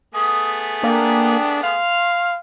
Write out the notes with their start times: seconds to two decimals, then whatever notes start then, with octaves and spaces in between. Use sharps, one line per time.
0.14 A3 B3 G#4 D#6
0.83 A#3 D4 G5
1.64 F5 C6 F6